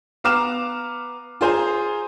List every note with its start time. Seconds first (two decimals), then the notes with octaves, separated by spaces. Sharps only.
0.24 B3 F5 A#5 D6 F6 E7
1.41 F4 G#4 C5 G#5 A#5